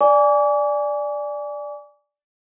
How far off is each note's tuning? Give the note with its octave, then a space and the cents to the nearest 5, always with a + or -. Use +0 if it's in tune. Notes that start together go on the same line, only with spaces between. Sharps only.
D5 +0 G#5 +0 D6 -40